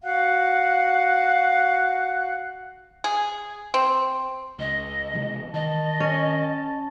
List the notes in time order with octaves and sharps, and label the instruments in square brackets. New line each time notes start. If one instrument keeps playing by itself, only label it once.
[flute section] F#4 F5 F#5 F#6
[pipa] G#4
C4
[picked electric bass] C#2 [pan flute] D#5
[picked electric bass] C3 E3 G#3
[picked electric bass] D#3 [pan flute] D#5 [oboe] A5
[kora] C#4